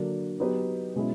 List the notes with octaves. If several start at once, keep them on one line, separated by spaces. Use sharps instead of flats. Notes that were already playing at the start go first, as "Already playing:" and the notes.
Already playing: D3 F#3 A#3 D4
F#3 B3 D#4 G4 B4
B2 G#3 C#4 E4